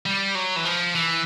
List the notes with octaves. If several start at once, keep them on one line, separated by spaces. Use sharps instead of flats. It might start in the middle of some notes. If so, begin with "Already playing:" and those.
G3
F#3
E3
F3
E3